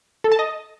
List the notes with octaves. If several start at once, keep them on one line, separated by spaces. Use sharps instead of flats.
A4
A5
D#5